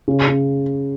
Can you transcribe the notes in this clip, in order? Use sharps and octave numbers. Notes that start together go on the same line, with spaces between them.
C#3
C#3